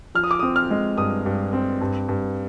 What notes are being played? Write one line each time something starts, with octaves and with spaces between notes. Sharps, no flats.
F3 F6
D#6
D6
C4 D#6
F6
G#3
G2 D#6
G2
C4
G2
G2